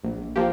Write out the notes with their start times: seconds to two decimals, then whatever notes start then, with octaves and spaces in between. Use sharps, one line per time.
0.04 A#1
0.36 F3 A#3 G4